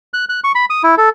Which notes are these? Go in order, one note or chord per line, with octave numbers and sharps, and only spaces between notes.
F#6
F#6
C#6
B5
D#6
E4
A4